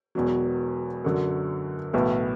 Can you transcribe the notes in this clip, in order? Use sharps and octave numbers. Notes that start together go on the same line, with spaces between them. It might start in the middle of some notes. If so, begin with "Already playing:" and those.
E1 E2 B2 F#3
F#2 D3 F#3
B1 A2 E3 B3 E4